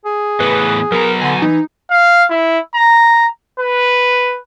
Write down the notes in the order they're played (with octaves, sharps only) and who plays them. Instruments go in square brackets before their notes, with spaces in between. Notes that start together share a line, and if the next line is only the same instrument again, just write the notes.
[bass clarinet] G#4
[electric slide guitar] A2 E3 B3 [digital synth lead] B4
[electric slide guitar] F#3 B3 A#5 [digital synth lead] A#4
[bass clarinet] D3 [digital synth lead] G#5
[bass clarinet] E3 [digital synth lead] D#4
[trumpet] F5
E4
A#5
B4